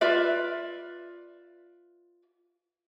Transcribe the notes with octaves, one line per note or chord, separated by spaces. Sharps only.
F4 B4 D5 E5